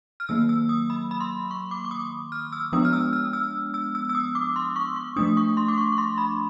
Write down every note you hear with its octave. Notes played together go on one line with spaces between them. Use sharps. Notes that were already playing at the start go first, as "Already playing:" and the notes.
F6
D#3 F#3 A#3 E6
E6
D#6
B5
B5
C6
C#6
D6
D6
D#6
F6
E6
F3 G#3 B3 D4 D#6
F6
E6
F6
E6
E6
E6
E6
D#6
D6
C6
C#6
C#6
F3 A3 D4 D#6
C#6
C6
D6
C#6
C#6
C6
B5